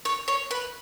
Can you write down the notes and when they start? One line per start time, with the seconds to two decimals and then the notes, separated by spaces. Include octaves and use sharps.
0.05 C#5
0.28 C#5
0.51 B4